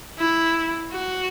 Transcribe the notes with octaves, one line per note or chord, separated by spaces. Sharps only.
E4
F#4